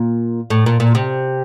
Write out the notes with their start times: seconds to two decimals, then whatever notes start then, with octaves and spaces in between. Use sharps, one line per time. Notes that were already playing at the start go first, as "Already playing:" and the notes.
Already playing: A#2
0.50 A2
0.66 A#2
0.80 A#2
0.95 C3